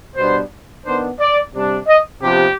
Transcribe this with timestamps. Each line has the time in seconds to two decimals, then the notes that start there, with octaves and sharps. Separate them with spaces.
0.16 B2 G3 B3 D4 C5
0.85 D#3 B3 D4 C5
1.19 D5
1.54 C3 G3 D4
1.87 D#5
2.22 C3 F3 B3 D4 G4